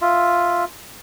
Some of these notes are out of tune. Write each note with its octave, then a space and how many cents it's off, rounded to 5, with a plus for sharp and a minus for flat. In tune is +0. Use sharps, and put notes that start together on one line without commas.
F4 +0 E5 +0